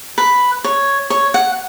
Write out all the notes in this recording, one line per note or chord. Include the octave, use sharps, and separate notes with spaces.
B4
C#5
C#5
F#5